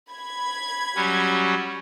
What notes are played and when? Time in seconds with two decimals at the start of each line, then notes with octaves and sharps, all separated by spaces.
0.11 B5 G#6
0.96 F#3 G3 C#4